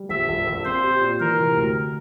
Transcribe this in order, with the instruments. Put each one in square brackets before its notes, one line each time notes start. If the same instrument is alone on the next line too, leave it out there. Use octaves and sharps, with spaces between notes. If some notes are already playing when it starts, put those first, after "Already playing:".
Already playing: [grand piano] G3
[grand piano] A#1 [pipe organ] E5
[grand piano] A#1
A#1
[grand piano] C4 [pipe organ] C5
[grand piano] G4
A#2
[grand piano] E3 [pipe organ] A#4
[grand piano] C3
D2